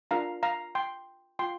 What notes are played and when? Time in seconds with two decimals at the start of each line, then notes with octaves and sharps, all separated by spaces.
0.11 D4 F4 A#4 F5 A#5
0.43 F5 A#5
0.75 G5 C6
1.39 F4 G5 C6